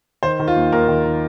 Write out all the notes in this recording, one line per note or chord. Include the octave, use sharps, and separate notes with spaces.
D#3 C5
D#3
F4
D#2
D#2 A#4
D#3
D#3